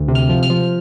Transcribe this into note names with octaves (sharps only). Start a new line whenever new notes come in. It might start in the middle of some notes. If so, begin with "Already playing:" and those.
Already playing: D2
C3
F6
F3
F6
F3